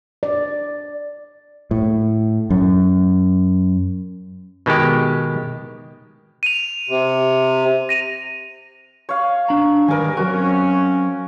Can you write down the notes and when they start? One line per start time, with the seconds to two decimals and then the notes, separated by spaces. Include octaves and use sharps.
0.23 D5
1.71 A2
2.50 F#2
4.66 B2 D#3 G#3 G4
6.43 D#7 F7
6.89 C3
7.89 A#6 D#7 F7
9.09 C#5 F5
9.48 D4 A#5
9.88 G#2 D#3 G3 A#4 B4 G#5
10.17 F#3 C4 C#4 F#4 A#4